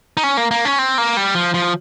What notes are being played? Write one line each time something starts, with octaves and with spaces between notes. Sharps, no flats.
D#4
C#4
A#3
A#3
C#4
C4
A#3
G3
F3
F3